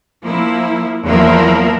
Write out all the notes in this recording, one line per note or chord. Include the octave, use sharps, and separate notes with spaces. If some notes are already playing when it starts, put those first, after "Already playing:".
F3 A#3 E4
E2 F3 F#3 A#3 E4 A#4